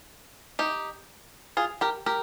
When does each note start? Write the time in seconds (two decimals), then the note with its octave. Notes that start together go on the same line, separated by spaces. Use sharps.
0.59 D#4 G4
1.57 F4 G#4
1.81 G4 A#4
2.06 G4 A#4